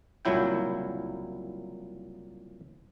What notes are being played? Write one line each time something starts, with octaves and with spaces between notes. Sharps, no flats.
C2 A#2 C#3 F#3 E4 G5